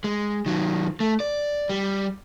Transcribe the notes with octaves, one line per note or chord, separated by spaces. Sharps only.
G#3
D#3 F#3
A3
D5
G3